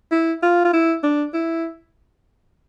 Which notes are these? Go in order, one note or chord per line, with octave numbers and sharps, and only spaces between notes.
E4
F4
F4
E4
D4
E4